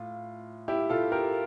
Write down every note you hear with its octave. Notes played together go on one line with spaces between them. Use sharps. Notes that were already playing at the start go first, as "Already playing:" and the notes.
Already playing: A2 F4
E4 G4
F4 A4
G4 A#4